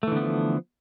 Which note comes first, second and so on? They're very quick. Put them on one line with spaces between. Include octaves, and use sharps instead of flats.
A3 E3 D3 B3 F3